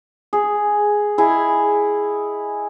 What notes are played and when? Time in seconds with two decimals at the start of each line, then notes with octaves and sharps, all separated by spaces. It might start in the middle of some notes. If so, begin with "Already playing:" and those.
0.33 G#4
1.18 E4 G#4 D#5 G#5